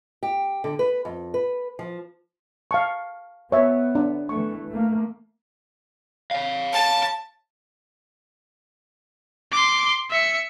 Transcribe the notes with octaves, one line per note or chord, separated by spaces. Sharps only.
G4
D3
B4
F2
B4
F3
F5 A5 C#6
B3 C#5 E5
D4
E3 A3 C#6
A3 A#3
C#5 F5
A5
C6 D6
E5 C#7